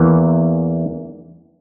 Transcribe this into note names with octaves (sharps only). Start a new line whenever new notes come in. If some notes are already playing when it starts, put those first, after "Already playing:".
Already playing: E2 E3 A#3